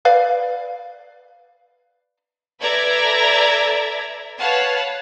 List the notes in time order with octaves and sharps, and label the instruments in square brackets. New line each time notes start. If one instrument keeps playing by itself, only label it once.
[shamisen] B4 D5 F5
[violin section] A4 B4 D5 E5 A#5 G#6
B4 C#5 F5 F#5 A5